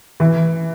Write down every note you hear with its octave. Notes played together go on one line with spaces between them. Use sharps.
E3